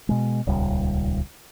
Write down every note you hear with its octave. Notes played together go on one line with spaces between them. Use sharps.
B2 G#3
D#1 C#2 G3